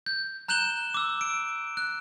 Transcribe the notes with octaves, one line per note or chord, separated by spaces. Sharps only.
G6
A#5 F#6 G6 E7 F#7 G7
D6 E6
D7
F#6